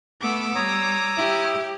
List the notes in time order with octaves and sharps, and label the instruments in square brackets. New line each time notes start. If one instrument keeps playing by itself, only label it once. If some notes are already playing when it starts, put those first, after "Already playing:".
[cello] A3 B3 [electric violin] D6 E6
[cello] G3 [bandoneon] C#5 A#5 D#6
[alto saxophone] E4 [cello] G4